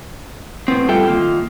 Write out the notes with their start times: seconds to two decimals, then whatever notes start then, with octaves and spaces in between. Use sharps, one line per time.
0.68 A2 B3 C4
0.89 G3 F4 A4 E5 G5
1.08 D#3 A#3 F4